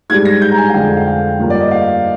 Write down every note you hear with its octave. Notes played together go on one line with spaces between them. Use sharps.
G#2 G3 D4 G#6
A#6
G6
A#5
G#5
F5
F2 D3 G#3 D4 G5
F5
G5
G2 F3 A#3 D4
D5
D#5
F5